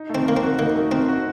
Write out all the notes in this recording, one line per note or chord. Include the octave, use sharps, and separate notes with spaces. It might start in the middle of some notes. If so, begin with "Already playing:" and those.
Already playing: D#4
A3
C4
A#3 A#4
C4
F#4
A#3 D#4
A3
C4 A#4
F#4